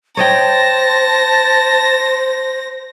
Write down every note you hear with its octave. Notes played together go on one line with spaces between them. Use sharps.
C5 C#5 D#5 G5 A5 A#6